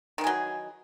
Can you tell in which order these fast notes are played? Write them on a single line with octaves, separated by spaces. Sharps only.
D#3 E3 G#4 F#3